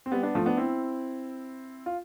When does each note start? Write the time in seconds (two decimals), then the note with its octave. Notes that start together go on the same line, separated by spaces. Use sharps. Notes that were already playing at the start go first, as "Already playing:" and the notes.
0.06 C4
0.12 G3 B3
0.23 B3 D4
0.35 F3 A3
0.46 B3 D4
0.57 C4 E4
1.86 F4